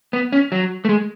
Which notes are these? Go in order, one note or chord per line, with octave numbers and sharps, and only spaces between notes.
B3
C#4
F#3
A3
G#3